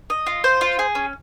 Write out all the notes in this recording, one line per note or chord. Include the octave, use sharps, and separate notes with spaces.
D#5
F4
C5
F4
G#4
C#4